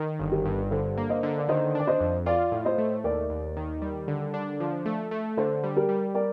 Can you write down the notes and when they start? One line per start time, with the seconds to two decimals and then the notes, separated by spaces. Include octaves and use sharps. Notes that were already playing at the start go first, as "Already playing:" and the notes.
Already playing: D#3
0.20 G1
0.32 G4 A#4
0.45 G2
0.71 D3 A4 C5
0.98 A#3
1.09 C5 D#5
1.23 D3
1.38 D5
1.48 D#3 C5 D#5
1.75 D4 D5
1.87 C5 D#5
2.01 F2
2.26 F4 D5 F5
2.52 A2
2.65 C5 D#5
2.78 A3
3.04 D#2 A#4 D5
3.30 D#2
3.57 D#3
3.82 G3
4.08 D3
4.34 D4
4.60 F3
4.86 A3
5.11 A3
5.37 D3 A4 C5
5.63 G3
5.76 G4 A#4
5.89 G3
6.15 A#4 D5